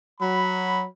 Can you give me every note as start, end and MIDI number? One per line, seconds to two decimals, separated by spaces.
0.20 0.86 54
0.20 0.86 83